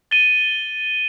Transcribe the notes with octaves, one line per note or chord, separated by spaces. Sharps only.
A6 D#7 G7